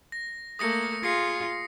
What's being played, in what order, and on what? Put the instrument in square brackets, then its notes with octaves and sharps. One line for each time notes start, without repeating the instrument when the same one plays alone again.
[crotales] A#6
[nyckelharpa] A3 A#3 [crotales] D#6 A#6 C#7
[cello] F4 [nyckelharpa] G#4 [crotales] A#6 C7 C#7